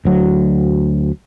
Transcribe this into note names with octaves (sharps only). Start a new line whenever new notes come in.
D2 F#3